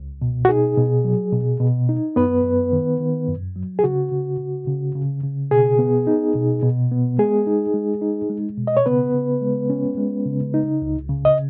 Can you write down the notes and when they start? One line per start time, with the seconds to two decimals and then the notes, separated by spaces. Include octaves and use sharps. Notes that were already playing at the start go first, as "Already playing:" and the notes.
Already playing: C#2
0.22 B2
0.45 F#4
0.49 D#4 G#4
0.78 B2
1.04 F#3
1.32 B2
1.60 B2
1.89 D#4
2.16 F#2 B3 B4
2.44 F#2
2.72 D#3
3.00 D#3
3.28 F#2
3.56 F#3
3.79 G#4
3.84 C#3 F#4
4.12 C#3
4.39 C#3
4.67 C#3
4.95 C#3
5.23 C#3
5.51 B2 G#4
5.79 B3
6.07 D#4
6.35 B2
6.63 B2
6.91 B3
7.19 G#3 G#4
7.47 D#4
7.74 G#3
8.02 D#4
8.30 G#3
8.58 B2
8.67 D#5
8.77 C#5
8.86 C#3 B3 B4
9.14 C#3
9.41 G#3
9.70 C#4
9.97 G#3
10.25 C#3
10.54 D#4
10.82 C#2
11.09 C#3
11.25 D#5